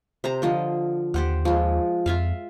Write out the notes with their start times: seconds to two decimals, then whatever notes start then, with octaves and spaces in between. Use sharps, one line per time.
0.24 C3 C5 A#5
0.42 D3 F3 D#5
1.14 D#2 G4 C5 F#5
1.45 F3 G#3
2.06 F2 F4 E5 F5